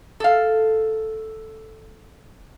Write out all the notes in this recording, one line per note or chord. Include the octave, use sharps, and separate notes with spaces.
A4 F5